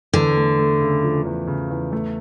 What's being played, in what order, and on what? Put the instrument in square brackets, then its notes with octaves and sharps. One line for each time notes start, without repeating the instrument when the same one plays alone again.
[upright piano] E2 [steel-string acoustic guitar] D3
[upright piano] A3
A3
C#3
F3
E2
C#3
E2
A3